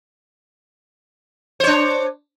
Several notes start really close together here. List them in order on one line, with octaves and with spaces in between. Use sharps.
C5 C#5 D4